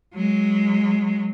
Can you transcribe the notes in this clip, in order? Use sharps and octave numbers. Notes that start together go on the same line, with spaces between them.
F#3 G#3